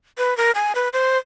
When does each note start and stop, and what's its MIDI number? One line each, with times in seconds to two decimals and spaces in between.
0.18 0.36 71
0.37 0.51 70
0.55 0.73 80
0.75 0.89 71
0.93 1.17 72